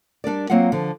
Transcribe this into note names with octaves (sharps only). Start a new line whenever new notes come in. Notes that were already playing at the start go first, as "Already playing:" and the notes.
G3 D4 A#4 D5
F#3 A#3 C4 F4 F#5
D3 F3